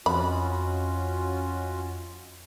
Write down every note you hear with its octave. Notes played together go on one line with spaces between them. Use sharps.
F2 C#4 F4 F#4 D#5 B5